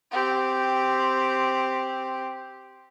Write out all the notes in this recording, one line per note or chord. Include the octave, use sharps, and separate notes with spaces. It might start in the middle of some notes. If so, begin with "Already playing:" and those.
C4 G4